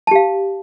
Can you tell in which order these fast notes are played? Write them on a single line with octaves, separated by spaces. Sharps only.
A5 G4 F5